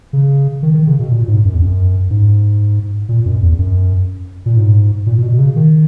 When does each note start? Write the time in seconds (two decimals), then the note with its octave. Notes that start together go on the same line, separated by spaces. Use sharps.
0.13 C#3
0.63 D#3
0.74 D#3
0.87 C#3
1.00 B2
1.11 A#2
1.28 G#2
1.45 F#2
1.54 E2
1.61 F#2
2.10 G#2
3.09 A#2
3.26 F#2
3.42 E2
3.59 F#2
4.46 A#2
4.57 G#2
5.06 A#2
5.18 A#2
5.22 B2
5.33 B2
5.38 C#3
5.56 D#3